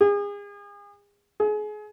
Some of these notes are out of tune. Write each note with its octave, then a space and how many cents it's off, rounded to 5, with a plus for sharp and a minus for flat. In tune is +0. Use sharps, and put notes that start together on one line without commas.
G#4 -35
G#4 +30